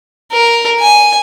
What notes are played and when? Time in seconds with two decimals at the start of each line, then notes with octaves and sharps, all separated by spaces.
0.32 A#4
0.79 G#5